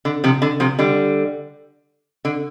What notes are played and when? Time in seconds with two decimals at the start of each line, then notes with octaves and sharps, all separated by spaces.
0.05 D3
0.24 C3 F3
0.42 D3
0.60 C3 F3
0.79 D3 G3
2.25 D3